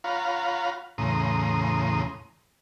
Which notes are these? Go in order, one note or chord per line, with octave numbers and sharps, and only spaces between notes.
F4 C#5 F5 F#5 A#5 B5
E2 A2 C#3 A#5 C6 D#6